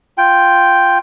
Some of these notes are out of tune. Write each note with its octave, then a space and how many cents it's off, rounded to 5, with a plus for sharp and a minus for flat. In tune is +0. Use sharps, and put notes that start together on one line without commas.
F4 +0 G5 +0